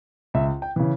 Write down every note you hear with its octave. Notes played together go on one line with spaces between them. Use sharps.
C#2 E5
G5
C#3 E3